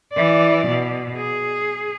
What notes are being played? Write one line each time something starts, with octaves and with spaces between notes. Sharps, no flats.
E3 D5
B2
G#4